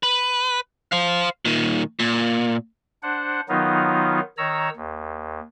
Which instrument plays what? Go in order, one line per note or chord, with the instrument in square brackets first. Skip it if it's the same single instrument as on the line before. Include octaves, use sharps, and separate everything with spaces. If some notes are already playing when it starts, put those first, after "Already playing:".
[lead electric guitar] B4
C5 F5
A#2 D#3
A#2
[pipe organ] D4 C5 F#5
D#3 F#3 B3 D#4 F4
D#3 C#5 A#5 E6
D#2